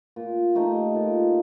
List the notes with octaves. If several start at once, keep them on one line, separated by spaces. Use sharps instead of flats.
A#2
A3 D#4 G4
A#2